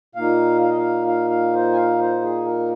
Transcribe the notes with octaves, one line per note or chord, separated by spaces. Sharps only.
A#2 A#3 D#4 F5
F5
D#5
F5
F5
F5
C5
G#5
F5
C5
G#4
A#4